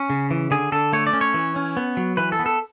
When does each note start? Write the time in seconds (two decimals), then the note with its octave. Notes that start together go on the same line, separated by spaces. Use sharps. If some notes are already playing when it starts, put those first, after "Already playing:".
Already playing: C#4
0.10 C#3
0.31 E3
0.51 D3 G#4
0.72 D3 A4
0.93 A3 C#5
1.07 D5
1.13 C#4
1.21 C#5
1.34 E3
1.56 C#4
1.77 B3
1.97 F#3
2.17 E3 B4
2.32 A4
2.39 B3
2.46 A4